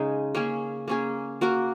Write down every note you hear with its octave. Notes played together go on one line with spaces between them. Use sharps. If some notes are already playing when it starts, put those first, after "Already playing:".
Already playing: C#3 G#3 D#4 G#4
A#3 C#4 G#4
A#3 C#4 G#4
A#3 F#4 A#4